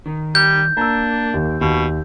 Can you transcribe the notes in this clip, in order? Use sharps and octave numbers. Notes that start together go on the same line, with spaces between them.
D#3
G3 G6
A#3 D4 A#5 E6
D#2
D#2 B2